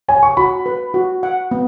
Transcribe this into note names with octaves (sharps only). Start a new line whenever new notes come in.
C#5 G#5
C#6
F#4 B5
B4
F#4
F#5
B3